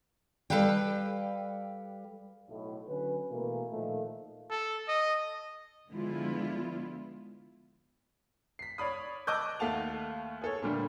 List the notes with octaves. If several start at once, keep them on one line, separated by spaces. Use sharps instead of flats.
G3 A4 B4 F5 G5
B1 A2
D3 F#3 C#4 B4
B2 E3 A3 A#3
A#2 D#3 F3 A3
A4
D#5
D3 F3 G#3 B3 E4 F4
B6 C7
C#5 D5 B5 D#6
D#5 A5 D6 E6 F#6 G6
D#2 A3 F5 F#5 A5 F7
G#4 A4 C#5
A#2 D3 G3 A3